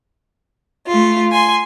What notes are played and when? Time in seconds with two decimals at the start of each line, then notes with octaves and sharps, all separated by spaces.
0.88 A3 F4
1.32 G#5 C6